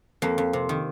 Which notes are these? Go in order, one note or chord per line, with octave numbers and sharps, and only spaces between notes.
F2 A#3
F2
C3
D#3